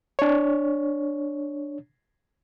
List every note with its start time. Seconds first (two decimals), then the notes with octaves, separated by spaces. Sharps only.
0.19 D4 C#5